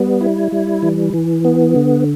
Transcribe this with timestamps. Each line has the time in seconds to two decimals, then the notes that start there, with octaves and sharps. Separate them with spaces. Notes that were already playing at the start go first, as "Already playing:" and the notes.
Already playing: G3 B3
0.21 E4
0.52 G3
0.82 E3
1.14 E3
1.45 B3
1.76 D3